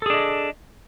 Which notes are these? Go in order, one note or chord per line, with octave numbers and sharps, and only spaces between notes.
D4 G#4 A4 D#5